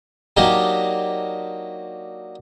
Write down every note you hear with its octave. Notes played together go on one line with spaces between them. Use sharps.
F#3 A#3 D4 D#4 G4